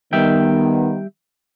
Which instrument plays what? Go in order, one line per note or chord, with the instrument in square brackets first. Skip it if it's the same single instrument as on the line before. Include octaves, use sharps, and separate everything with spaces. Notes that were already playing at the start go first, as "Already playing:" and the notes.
[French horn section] D#3 B3 [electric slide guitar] G3 E5 G5